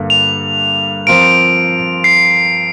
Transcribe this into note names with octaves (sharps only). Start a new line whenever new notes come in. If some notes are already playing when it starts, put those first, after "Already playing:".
Already playing: G2 D3 A#3
F7
F3 C4 F4 A#4 D7
C7